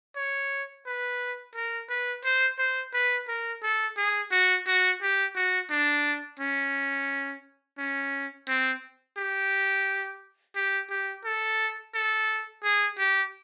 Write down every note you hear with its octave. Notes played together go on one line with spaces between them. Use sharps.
C#5
B4
A#4
B4
C5
C5
B4
A#4
A4
G#4
F#4
F#4
G4
F#4
D4
C#4
C#4
C4
G4
G4
G4
A4
A4
G#4
G4